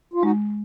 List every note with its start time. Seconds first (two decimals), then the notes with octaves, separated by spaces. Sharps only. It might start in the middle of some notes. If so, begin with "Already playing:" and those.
0.14 F4
0.22 G#3 D#4 F#4